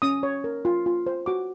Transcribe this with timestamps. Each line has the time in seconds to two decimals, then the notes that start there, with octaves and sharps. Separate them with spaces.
0.02 C#4 D#6
0.23 C#5
0.44 A#4
0.65 F4
0.86 F4
1.07 C5
1.26 F#4 D6